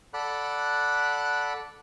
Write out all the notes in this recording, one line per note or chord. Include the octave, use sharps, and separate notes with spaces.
A4 D5 F#5 B5 F#6